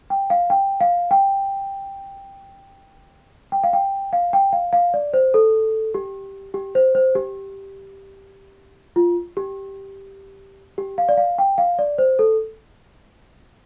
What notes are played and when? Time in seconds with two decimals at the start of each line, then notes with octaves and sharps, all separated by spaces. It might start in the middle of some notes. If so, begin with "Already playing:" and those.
0.10 G5
0.30 F5
0.50 G5
0.81 F5
1.11 G5
3.52 G5
3.64 F5
3.73 G5
4.13 F5
4.33 G5
4.53 F5
4.73 F5
4.94 D5
5.13 C5
5.34 A4
5.94 G4
6.54 G4
6.75 C5
6.95 C5
7.15 G4
8.96 F4
9.37 G4
10.78 G4
10.98 F5
11.09 D5
11.17 F5
11.38 G5
11.58 F5
11.79 D5
11.98 C5
12.19 A4